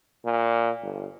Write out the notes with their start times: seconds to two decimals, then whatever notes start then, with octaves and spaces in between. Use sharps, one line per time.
0.25 A#2
0.83 G1